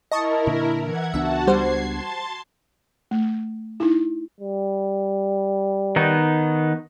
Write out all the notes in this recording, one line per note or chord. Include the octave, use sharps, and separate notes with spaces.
E4 A#4 D#5 A5 C#6
A#2 D3
E3 F#5 G#6
C#2 B3 D4 F#4 E5 F#5 A5
G3 C5 G#6 C7
A5 C6 A6
A3
D#4 E4
G3
D#3 B3 D#4